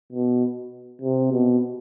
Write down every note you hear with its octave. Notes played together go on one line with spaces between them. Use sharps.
B2
C3
B2